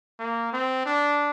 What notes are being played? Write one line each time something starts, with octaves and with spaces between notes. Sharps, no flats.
A#3
C4
D4